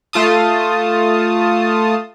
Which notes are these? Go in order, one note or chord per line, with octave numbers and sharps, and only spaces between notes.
A3 F4 A5 D#6